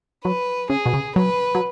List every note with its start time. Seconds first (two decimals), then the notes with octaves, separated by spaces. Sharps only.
0.24 F#3 B4
0.70 C#3 G#4
0.86 B2
0.93 C#3
1.16 F#3 B4
1.55 F#3